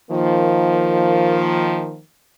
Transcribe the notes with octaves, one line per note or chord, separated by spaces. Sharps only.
D#3 F3 A#3